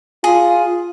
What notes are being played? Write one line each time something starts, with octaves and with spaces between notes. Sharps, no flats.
F4 G#4